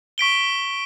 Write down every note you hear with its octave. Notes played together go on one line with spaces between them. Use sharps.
C#6 B6 D7 G7